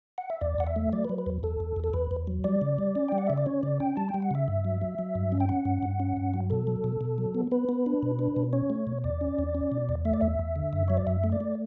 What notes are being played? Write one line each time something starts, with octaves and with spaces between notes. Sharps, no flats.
F#5
E5
E2 D5
E2 F#5
E5
A3
F#3 D5
B4
F#3
B4
E2
E2 A4
E2
E2
A4
E2 B4
E2
F#3
G3 D5
C#3
G3
C#4
G3 G5
F#5
C#3 E5
D5
C#4 C#5
C#3 D5
C#4 G5
G3 A5
G5
G3
F#5
C#3 E5
G2
F#3
F#3
F#3
G2
C#4
G5
C#4 F#5
G2
G2
C#4
G2
F#3
B2 A4
F#3
B2
B2
F#3
B3
B3 B4
B3
D4
B2
D4
B2
C#4 C#5
A3
B2
E2 D5
C#4
E2
C#4
B2
E2
A3 E5
D5
E2 E5
E2
D3
F#2
F#3 C#5
D5
F#2 E5
A3
D5
A3